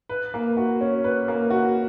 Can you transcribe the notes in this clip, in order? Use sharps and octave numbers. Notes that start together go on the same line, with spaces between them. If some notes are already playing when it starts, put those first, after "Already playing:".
B4
A#3
F#4
C#4
B4
A#3
F#4